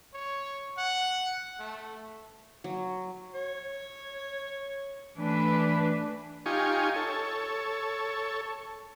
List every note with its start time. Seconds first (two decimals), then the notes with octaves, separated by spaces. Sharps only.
0.14 C#5
0.78 F#5
1.59 A3
2.64 F#3
3.34 C#5
5.18 E3 A3 D4 B4
6.46 D#4 F4 G4 G#5 C#6
6.96 A4 C#5